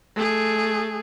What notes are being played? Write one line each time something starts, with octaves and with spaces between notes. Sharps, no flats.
A3 G#4